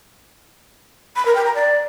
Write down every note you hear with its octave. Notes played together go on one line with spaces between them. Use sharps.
B5
A#4
G5
A#5
D5